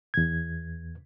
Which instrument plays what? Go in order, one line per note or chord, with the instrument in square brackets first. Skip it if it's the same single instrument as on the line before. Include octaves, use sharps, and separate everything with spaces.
[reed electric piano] E2 G#6